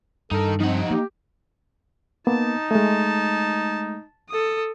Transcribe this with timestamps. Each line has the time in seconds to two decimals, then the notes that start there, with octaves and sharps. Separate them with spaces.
0.31 G2 D#4 A4 A#4
0.60 F3 C4 D#4 F#5
0.91 A#3 G4
2.27 A#3 B3 D#4 A5
2.71 G#3 A3 A5
4.29 A4 D#6